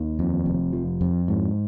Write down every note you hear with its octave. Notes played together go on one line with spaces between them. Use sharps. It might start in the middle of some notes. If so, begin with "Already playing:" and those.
Already playing: D#2 D#3
F2
F1
F3
F2
G#2